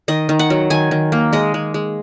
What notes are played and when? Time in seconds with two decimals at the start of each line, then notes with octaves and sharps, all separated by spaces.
0.08 D#3 D#5
0.29 D#3
0.39 F#5
0.50 F#3
0.70 D#3 G#5
0.91 D#3
1.12 A#3
1.33 G#3 D#5
1.54 G#3
1.74 G#3